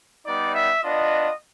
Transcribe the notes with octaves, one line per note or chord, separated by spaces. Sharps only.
G3 B3 D#4 D5
E5
B3 D4 F4 D#5